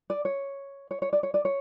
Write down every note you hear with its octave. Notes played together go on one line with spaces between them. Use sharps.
D5
C#5
C#5
C#5
D5
C#5
D5
C#5